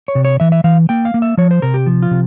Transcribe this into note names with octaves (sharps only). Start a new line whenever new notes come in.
C#5
C3
C#5
E3 E5
E5
E3 F5
A#3 G5
F5
A#3
E5
F3 C#5
C5
C3 A#4
G4
F3
F4
C3